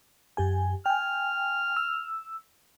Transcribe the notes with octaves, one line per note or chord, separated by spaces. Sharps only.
F#2 G4 G#5
G5 G#5 F6
E6